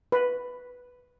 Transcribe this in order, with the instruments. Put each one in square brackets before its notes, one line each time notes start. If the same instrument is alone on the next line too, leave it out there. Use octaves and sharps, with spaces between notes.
[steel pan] B4